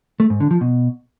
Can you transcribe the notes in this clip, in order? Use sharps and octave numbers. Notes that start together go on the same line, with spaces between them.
A3
G#2
D3
F3
B2